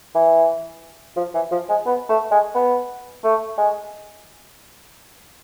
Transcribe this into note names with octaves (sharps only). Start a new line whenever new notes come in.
E3
F3
E3
F3
G#3
B3
A3
G#3
B3
A3
G#3